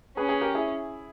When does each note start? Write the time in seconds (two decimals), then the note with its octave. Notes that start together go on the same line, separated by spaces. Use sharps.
0.17 C#4 G#4 B4
0.29 G#4 B4
0.41 G4 A#4
0.55 E4 G#4